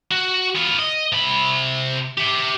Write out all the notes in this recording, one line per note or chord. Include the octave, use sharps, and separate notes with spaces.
F#4
B3 F4
D#5
C3 B5
G4 E5